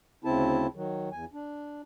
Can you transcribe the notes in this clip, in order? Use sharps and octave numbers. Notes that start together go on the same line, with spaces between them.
D2 C#3 C4 E4 A5
D#3 F#3
E2 G#5
D4